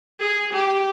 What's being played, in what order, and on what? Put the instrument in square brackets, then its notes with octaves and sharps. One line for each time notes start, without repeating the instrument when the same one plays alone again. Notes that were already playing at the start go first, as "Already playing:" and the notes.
[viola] G#4
G4